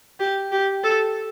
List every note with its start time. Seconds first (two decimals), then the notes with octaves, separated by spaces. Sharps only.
0.20 G4
0.52 G4
0.84 A4